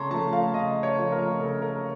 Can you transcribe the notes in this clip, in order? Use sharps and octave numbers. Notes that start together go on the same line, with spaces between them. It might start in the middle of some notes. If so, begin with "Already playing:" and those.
Already playing: C#3 A3 C#5 A5 A#5 C6
F3 A3 A5
F5
C#3 D#5
C#5
F3 A3
A#4
C#3 A4
A#4